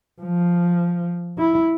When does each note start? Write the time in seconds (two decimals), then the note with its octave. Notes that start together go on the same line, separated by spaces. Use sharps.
0.22 F3
1.38 E4